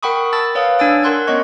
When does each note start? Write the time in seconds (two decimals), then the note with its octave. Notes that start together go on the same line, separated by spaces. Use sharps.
0.03 A#4 F#5 G5 B5 C#6 D#6
0.33 A5 B5 E6 A6
0.55 B4 C#5 F5 F#5 B5 D#6
0.79 D4 G#5 E6 A6 D7
1.03 A#4 F#5 C6 F#6 G#6
1.28 B3 C#4 C#5 D#5 C#6